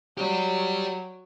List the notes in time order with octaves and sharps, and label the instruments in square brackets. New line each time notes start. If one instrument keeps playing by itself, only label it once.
[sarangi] F#3 [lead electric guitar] G4 D5